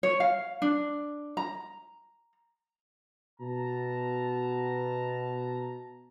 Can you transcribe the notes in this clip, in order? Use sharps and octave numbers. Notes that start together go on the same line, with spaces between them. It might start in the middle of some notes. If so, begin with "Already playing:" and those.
C#5
F5
D4
A#5
B2 A5 A#5